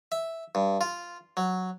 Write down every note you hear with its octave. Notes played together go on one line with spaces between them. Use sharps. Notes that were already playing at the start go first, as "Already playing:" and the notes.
E5
G2
F4
F#3